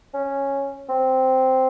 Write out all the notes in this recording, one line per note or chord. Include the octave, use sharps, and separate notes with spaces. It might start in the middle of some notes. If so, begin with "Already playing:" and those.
C#4
C4